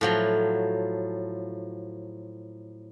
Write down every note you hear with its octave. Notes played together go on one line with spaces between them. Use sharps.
A2 F3 F#3